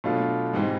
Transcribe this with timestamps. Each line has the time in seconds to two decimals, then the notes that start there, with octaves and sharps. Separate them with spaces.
0.04 B2 F#3 A3 D4 F4
0.53 G#2 E3 G3 C4 D#4